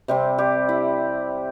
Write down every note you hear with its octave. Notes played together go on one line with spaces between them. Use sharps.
C3 G3 C4
G3 G4
E4